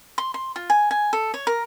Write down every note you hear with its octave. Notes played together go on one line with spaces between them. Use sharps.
C6
C6
F4
G#5
G#5
A4
C#5
A#4